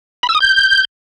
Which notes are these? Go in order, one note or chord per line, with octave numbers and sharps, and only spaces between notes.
B5
E6
D#6
G6